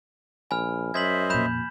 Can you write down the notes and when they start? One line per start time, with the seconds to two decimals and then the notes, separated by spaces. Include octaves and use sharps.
0.51 A#1 G#5 B5 F6
0.94 F#2 C5 D#5 E5 G#6 B6 F#7
1.30 F2 A#2 B5 G6 E7